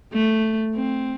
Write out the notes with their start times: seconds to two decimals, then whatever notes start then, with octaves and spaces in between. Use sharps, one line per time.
0.13 A3
0.75 C4